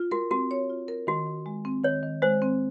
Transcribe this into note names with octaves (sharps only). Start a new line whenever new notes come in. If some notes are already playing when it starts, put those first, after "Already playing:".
Already playing: F4
F#4 A#4
C4 F#4
C#5
F4
A#4
D#3 F#4
D#3
G#3
C4
D#3 C#5
D#3
G#3 C5
C4